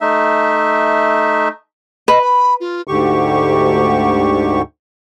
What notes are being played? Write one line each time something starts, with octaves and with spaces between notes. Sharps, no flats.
A3 D#4 E5
B4 D#5
B5
F4
D2 G#2 D3 G4 C#6